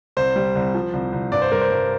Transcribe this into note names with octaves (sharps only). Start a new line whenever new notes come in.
C2 C5
G3
C2
F3
C2
C2
G2 D5
C5
G2 A#4
C5
G2